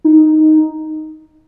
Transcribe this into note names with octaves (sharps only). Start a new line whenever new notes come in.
D#4